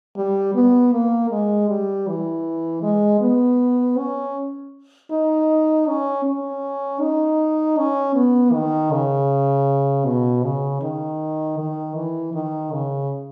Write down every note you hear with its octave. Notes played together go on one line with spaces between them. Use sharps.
G3
B3
A#3
G#3
G3
E3
G#3
B3
C#4
D#4
C#4
C#4
D#4
C#4
B3
D#3
C#3
B2
C#3
D#3
D#3
E3
D#3
C#3